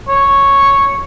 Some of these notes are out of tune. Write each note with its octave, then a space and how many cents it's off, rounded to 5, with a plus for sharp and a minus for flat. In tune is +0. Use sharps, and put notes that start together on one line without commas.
C#5 -5